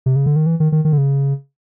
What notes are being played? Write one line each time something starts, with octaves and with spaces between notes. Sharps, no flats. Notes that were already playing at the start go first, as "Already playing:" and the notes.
C3
C#3
D3
D#3
E3
D#3
D#3
D#3
D3
C#3